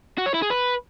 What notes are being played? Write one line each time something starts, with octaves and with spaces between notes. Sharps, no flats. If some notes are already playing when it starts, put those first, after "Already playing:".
F#4
C#5
E4
G#4
B4